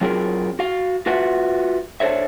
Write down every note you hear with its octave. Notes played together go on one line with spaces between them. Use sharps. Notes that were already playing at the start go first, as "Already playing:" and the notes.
F#3 C4 F4 G#4 A#4
F#4 F5
F4 F#4 B4 E5 F#5
D4 A4 C5 C#5 E5